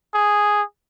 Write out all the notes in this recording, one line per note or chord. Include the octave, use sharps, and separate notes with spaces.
G#4